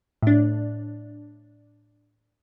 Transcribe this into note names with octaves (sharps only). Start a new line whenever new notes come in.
A2 D4